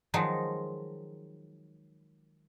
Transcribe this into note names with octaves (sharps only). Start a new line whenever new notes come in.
D#3 F3 F#3 G#3 D#4